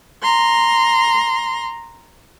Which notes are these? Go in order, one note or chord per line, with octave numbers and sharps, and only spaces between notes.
A#5 C6